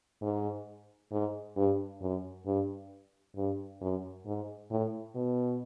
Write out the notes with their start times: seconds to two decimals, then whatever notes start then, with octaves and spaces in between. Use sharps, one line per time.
0.21 G#2
1.11 G#2
1.56 G2
2.01 F#2
2.46 G2
3.36 G2
3.81 F#2
4.26 G#2
4.71 A2
5.15 B2